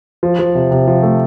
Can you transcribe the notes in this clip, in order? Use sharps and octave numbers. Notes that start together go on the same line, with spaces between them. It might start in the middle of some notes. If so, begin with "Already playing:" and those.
F3
F3
C3
C3
F3
A3